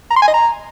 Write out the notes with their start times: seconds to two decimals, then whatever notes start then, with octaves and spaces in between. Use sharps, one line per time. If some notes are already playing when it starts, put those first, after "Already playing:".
0.11 A#5
0.16 C6
0.22 G#5
0.28 D#5
0.34 A#5